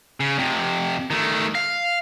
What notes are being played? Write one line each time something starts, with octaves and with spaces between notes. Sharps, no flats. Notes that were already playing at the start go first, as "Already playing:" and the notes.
C#3
F2 C3
D#3 A3
F5